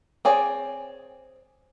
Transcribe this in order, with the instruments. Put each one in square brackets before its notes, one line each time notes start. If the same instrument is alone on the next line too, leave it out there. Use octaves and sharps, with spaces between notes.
[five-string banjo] C4 G#4 C#5 D5